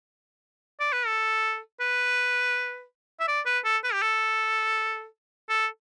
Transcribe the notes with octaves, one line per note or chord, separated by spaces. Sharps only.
D5
B4
A4
B4
E5
D5
B4
A4
B4
G4
A4
A4